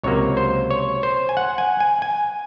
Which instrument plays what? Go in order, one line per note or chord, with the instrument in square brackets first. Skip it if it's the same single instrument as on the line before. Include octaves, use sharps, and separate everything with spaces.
[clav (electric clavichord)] C#2 C3 F#3 A#3 C#5
C5
C#5
C5
G#5
F#5
G#5
G#5
G#5